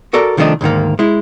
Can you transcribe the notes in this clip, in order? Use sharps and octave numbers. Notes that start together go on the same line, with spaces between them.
F#4 A4 A#4 D5
C2 D#3 F3 A3 D4 D#5
D2 G#2 D#3 A#3
G#3 E4